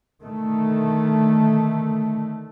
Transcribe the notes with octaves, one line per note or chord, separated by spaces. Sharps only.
D3 D#3 A3